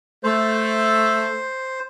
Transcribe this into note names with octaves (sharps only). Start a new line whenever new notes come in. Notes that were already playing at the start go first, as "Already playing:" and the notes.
A3 C5